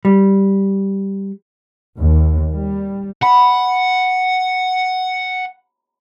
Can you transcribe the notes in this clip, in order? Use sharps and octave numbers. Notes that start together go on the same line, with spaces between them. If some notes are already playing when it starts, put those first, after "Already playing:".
G3
D#2
G3
F#5 B5